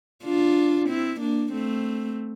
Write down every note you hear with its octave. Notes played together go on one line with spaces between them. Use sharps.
D4 F4
C4 E4
A#3 D4
A3 C4